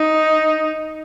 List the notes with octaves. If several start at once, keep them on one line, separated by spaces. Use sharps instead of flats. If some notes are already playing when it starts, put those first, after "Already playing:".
Already playing: D#4